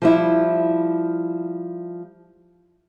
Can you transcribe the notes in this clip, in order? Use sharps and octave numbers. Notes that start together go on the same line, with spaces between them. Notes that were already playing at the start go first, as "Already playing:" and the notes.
F3 G3 E4